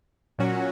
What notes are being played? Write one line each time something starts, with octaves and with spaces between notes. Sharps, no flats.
A#2 F#3 C#4 F#4